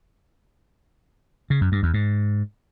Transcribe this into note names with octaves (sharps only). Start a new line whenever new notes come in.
C#3
F#2
G2
E2
G#2